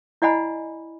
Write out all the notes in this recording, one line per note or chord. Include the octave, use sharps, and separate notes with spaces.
E4 D5 D#5 F#5 G#5 B5